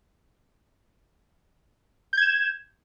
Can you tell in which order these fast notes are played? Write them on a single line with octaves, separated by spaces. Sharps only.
G6 G#6 E7